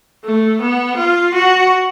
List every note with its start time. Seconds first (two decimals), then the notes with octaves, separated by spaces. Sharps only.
0.24 A3
0.61 B3
0.97 F4
1.34 F#4